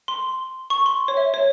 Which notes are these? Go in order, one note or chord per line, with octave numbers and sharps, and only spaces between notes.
C6
C#6
C6
C#5
E5
C#5